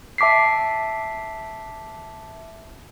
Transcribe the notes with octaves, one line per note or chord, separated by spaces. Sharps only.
E5 A5 D6 B6 C7